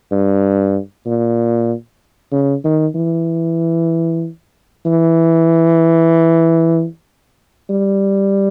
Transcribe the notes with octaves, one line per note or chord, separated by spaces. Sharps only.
G2
A#2
C#3
D#3
E3
E3
G3